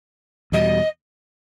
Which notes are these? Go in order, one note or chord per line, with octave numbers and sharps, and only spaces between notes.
E2 B2 G3 D#5